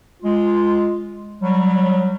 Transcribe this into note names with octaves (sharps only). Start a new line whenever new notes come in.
G#3 F4
F#3 G3